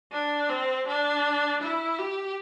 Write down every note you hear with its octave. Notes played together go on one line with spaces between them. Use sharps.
D4
C4
D4
E4
G4